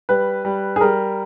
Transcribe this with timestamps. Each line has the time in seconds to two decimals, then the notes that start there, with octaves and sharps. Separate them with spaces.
0.09 G3 B4
0.45 G3
0.76 G#4
0.81 G3 A#4